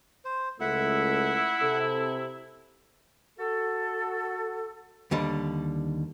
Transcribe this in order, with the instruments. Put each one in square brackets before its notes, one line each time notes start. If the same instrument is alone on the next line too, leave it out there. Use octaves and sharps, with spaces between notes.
[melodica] C5
[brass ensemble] C#2 A3 [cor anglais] E4 [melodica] E5 F#5
[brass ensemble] C3 [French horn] A4
[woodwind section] F#4 A4
[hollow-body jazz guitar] D#2 D3 G3